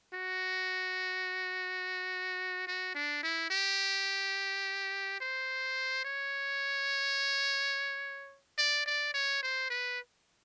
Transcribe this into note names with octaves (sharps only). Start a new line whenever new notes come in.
F#4
F#4
D4
E4
G4
C5
C#5
D5
D5
C#5
C5
B4